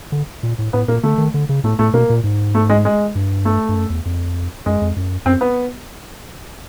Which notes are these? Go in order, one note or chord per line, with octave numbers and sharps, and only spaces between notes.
D3
A#2
A2
A2 B3
A#2 A#3
D3 A3
D#3
D3
C#3
A2 A3
A2 A3
B2 A#3
A#2
G#2
A3
G#3
G#3
G2
A3
G2
F#2
E2
F2
F#2 G#3
F2
F#2
F#2 C4
B3